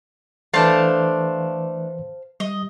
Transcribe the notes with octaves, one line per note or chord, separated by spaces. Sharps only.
E3 A3 D4 B4 C5 F5 A5
G3 D#5